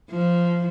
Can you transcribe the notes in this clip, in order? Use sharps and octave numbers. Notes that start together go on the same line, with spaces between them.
F3